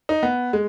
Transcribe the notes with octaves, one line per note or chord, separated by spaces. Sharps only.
D#4
B3
G#3